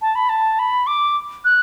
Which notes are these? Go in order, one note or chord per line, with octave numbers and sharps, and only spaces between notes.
A5
B5
A5
B5
D6
F#6